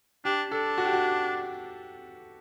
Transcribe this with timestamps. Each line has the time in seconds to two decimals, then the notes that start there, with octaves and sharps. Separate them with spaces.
0.25 D4 G4
0.51 D4 A4
0.78 F#4
0.85 G4
0.93 F#4